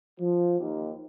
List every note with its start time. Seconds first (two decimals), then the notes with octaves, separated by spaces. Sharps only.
0.18 F3
0.59 D#2